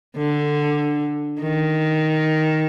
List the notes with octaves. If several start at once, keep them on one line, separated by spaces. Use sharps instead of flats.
D3
D#3